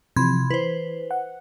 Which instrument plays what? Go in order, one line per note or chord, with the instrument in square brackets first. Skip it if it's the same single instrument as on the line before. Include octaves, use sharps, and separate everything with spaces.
[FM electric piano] C3 E3 F3 [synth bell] B5 C6 G#6
[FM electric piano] E3 [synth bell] B4 C5
[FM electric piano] F#5